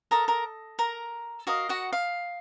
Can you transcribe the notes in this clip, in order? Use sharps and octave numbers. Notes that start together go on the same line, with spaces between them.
A4 A#4 D#5 A#5
A#4 A#5
A#4 A#5
F#4 A#4 D#5 F5
F#4 F#5
F5